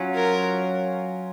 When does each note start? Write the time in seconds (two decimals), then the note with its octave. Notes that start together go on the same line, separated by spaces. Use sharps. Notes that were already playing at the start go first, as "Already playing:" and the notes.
Already playing: F#3 C#4 F4
0.15 A#4